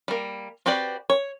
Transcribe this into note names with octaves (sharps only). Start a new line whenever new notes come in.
G3 A#3
C4 F#4 G4 B4 D5
C#5